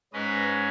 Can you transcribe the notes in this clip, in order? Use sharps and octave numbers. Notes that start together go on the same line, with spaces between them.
G#2 G#3 C#4 B4 D#5